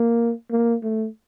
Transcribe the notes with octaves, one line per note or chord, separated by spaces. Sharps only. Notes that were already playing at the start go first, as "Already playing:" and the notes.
Already playing: A#3
A#3
A3